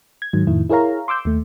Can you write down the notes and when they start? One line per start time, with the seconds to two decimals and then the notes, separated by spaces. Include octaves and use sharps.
0.22 G#6
0.33 G#2 D#3 F#3
0.47 F2 A2 D#3 E4
0.69 E4 G#4 A#4 C#5 F5 A#5
1.08 C6 D6 E6 G6
1.25 D#2 A3